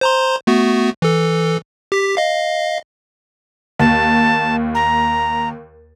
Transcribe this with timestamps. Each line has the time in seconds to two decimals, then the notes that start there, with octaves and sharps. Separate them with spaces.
0.01 C5 A#5 C6
0.47 A3 B3 F#4
1.02 E3 A4
1.92 G4 B6
2.17 D#5 F5
3.80 D#2 A5
4.75 A#5